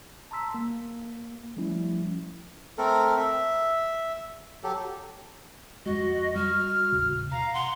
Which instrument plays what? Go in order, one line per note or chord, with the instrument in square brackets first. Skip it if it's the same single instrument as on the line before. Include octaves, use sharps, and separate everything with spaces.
[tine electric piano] A5 A#5 C6 E6 B6
A#3
F3 G3 A3 C#4 E4
[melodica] A3 C4 A4 A#4
E5
F#3 G4 A4
[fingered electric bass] F2 G#3 [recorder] F#4 [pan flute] D#5
[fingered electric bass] G3 [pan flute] F#4 [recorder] F6
[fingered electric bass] A1 D#2 C#3
[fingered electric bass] B2 [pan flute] F5 [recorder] A#5
[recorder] F#5 [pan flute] C6